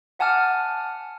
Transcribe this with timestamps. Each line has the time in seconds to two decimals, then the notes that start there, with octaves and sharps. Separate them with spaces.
0.19 E5 F#5 G#5 A5 D6 F6